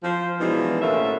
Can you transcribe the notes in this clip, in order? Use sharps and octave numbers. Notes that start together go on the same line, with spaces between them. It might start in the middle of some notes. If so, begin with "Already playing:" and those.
F3 C5
B2 E3 F3 G#3 D4 D#4
A2 D3 A#3 C#4 G4 E5